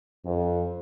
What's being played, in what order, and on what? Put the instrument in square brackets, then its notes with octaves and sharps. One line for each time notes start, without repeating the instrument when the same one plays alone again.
[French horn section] F2